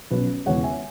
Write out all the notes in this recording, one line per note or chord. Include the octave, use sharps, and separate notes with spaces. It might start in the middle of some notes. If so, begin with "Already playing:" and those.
B1 B2 F#3 C#4 B4
E1 E2 C#3 C#5 F#5
E5 G#5